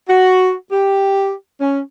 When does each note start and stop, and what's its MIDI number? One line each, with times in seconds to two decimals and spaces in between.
0.09 0.52 66
0.72 1.31 67
1.61 1.80 61